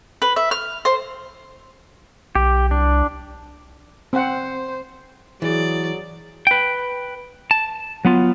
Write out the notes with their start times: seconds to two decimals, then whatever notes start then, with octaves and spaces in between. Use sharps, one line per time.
0.22 B4
0.36 E5
0.51 F6
0.85 C5
2.35 B1 G4
2.71 C2 D4
4.13 C4 C5 F#5
5.42 E3 F#3 G#4 D5
6.47 B4 G5
7.51 A5
8.05 F#3 B3 F4